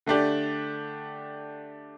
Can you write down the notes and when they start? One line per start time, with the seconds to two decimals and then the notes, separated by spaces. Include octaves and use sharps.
0.06 D3 A3 D4 G4 D5